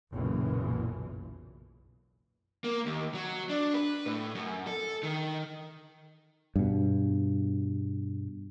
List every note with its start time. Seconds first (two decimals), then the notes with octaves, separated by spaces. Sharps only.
0.14 F#1 B1 F#2 A#2 E3
2.64 A#3
2.86 D#2
3.14 F#3
3.50 D4
3.74 B4
4.06 A2
4.35 F#2
4.67 A4
5.03 D#3
6.56 G2 B2